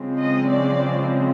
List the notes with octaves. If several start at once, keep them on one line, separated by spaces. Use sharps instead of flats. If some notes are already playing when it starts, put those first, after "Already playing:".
Already playing: C#3 F3 G#3 C4
D#5
D5